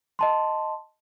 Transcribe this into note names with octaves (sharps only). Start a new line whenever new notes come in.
D#5 A5 C6